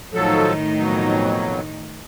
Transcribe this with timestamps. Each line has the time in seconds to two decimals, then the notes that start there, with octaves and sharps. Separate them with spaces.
0.14 A2 D#3 F3 F#3 D#4 A4
0.78 F2 B2 F#3